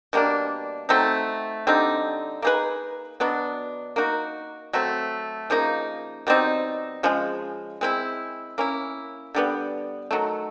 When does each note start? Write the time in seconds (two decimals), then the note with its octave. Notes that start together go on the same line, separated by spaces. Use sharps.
0.13 B2 G3 A#3 D4
0.89 F#3 A3 C4 D#4
1.67 D3 G3 C4 D#4
2.42 A#3 D#4 G#4 B4
3.20 B2 F#3 B3 D4
3.96 A#3 D#4 F#4
4.73 F#3 A3 C4
5.50 C#3 F3 A#3 D#4
6.27 B2 G3 C4 D#4
7.03 C#3 F3 G#3
7.81 G#3 C4 E4
8.58 A#3 C#4 E4
9.35 D3 G3 B3
10.11 D#3 F#3 A3